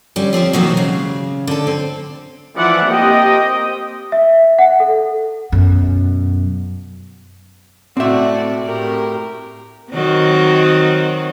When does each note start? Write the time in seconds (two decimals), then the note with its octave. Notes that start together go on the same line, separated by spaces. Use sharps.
0.16 D3 G3 C#4
0.33 F3 C4 F4 G4
0.53 B2 D#3 E3 F#3 A#3 C4
0.77 C#3 G#3
1.47 D3 A4
1.67 C4
2.56 E3 F3 D5 E5 F#5
2.86 A#3 C4 G4 D#5 G5
4.12 E5
4.59 F#5
4.80 A4
5.52 F#2 B2
7.97 A2 C4 F#4 D5 E5
8.66 A2 G4 A#4
9.92 D#3 F#3 C4